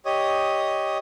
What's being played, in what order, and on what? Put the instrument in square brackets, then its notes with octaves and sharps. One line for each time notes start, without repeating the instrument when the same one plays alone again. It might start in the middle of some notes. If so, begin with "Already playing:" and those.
[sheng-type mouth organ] G4 C#5 D#5 D#6